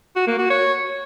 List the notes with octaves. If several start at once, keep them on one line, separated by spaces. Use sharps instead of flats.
F#4
A#3
F#4
C#5